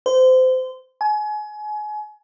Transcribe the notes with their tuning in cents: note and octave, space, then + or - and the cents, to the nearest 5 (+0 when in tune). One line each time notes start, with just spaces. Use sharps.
C5 -25
G#5 +30